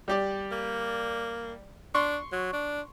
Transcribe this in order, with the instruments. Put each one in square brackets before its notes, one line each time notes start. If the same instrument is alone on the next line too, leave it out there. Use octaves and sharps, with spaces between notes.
[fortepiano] G3 G4 D5
[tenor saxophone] A#3
[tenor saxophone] D4 [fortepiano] C6 C#6
[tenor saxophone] F#3
D4